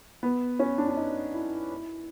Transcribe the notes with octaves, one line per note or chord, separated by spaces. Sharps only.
B3
C#4
D4
D4
D#4
E4
E4